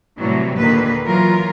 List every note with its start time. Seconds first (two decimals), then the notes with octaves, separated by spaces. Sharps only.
0.18 A2 C3 E3 F#3 G3
0.58 D#2 A#2 D3 D#3 A#3 B4
1.05 E3 F#3 F4 A#4